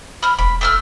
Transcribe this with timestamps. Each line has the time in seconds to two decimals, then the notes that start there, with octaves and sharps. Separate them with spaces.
0.23 B5 F6
0.39 E1 B5
0.61 A3 E6 F6